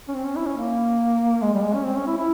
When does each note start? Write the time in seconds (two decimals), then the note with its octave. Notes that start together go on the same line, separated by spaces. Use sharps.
0.08 C#4
0.14 C4
0.24 C#4
0.36 E4
0.46 C#4
0.57 A#3
1.42 G#3
1.53 G3
1.64 G#3
1.74 C#4
1.84 C4
1.96 C#4
2.06 E4
2.17 E4